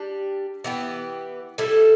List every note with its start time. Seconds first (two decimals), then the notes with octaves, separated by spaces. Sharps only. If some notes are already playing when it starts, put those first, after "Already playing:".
Already playing: G3 D4 G4
0.64 E3 B3 G4
1.58 G3 E4 A4